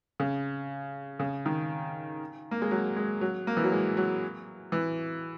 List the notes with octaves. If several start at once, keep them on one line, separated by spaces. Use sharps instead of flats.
C#3
C#3
D#3
A#3
G#3
F#3
G#3
F#3
A#3
E3
F#3
G#3
F#3
E3